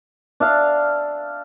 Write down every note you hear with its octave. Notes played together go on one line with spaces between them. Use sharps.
D4 E5 F5